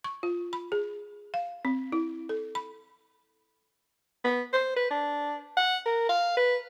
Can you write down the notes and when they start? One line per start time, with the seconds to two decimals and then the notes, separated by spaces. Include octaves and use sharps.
0.04 C#6
0.23 F4
0.53 B5
0.72 G#4
1.34 F5
1.65 C4
1.92 E4
2.29 A4
2.55 B5
4.24 B3
4.53 C5
4.76 B4
4.90 D4
5.57 F#5
5.86 A#4
6.09 F5
6.37 B4